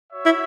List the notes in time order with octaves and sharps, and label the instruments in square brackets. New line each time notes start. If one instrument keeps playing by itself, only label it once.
[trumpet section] F#4 C#5 E5
[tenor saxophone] E4